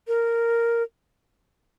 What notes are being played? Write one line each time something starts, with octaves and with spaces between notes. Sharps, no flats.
A#4